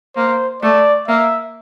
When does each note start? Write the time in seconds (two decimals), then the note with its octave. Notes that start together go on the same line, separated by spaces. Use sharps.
0.16 A#3 C5
0.62 A3 D5
1.08 A#3 E5